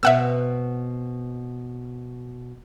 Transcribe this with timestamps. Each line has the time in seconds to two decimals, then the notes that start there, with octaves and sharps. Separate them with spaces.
0.03 B2 B3 C4 E5 F#5 E6